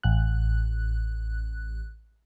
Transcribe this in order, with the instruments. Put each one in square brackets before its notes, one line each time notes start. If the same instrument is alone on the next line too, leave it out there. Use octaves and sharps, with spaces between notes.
[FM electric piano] A1 F#6